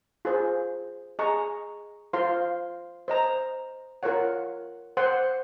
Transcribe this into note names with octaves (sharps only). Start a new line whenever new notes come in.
F4 G#4 C5
G#4 D#5 A#5 C#6
F4 C5 F5 C6
C5 D#5 A#5
F4 A#4 C#5 F#5
C5 F#5 C6